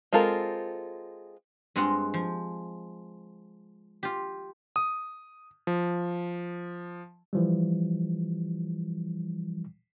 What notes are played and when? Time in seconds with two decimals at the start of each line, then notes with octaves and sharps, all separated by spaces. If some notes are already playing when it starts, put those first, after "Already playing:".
0.13 G#3 C4 F4 A4 A#4
1.76 G2 G#3 C4 F4 D#5 F#5
2.14 F3
4.03 F4 G4
4.76 D#6
5.67 F3
7.33 E3 F3 G3